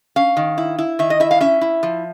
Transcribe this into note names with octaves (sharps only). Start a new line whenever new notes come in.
C#4 F5
D#3
E4
E4
D#3 E5
D#5
E4 E5
F5
C#4 E5
E4
F3